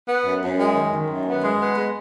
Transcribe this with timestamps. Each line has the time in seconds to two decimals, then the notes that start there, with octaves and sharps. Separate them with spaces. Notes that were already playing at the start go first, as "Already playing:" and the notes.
0.08 B3
0.25 F#2
0.42 F#2
0.58 G#3
0.75 D#3
0.92 D#3
1.09 F#2
1.26 B3
1.42 G#3
1.59 B3
1.76 G#3